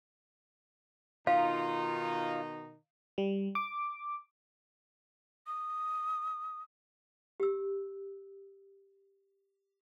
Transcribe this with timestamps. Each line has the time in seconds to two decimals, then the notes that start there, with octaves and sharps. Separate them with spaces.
1.27 B2 D#3 D#4 F4 F5
3.18 G3
3.55 D6
5.47 D#6
7.40 G4 E6